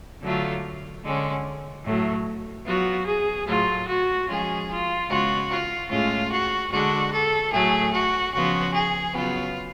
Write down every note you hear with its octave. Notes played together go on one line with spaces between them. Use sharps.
D3 F#3 A3 F4
D3 G#3 C#4
A2 F#3 A3
F#3 B3 F4 F#4
G#4
A2 F#3 A3 F4
F#4
F3 G#3 C#4 F4 G#4
F4
C#3 G#3 B3 F4 F#4
F4
A2 G#3 C#4 F4
F#4
D3 G#3 D4 F#4
A4
A2 F#3 A3 G#4
F#4
C#3 F3 B3 F4 F#4
G#4
C#3 F#3 B3 F4